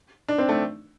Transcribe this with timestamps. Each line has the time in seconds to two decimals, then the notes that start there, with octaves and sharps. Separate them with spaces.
0.29 D4
0.38 C4
0.49 A3